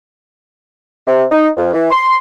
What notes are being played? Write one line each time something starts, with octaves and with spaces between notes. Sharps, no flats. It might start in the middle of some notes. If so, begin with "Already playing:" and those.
C3
D#4
F2
E3
C6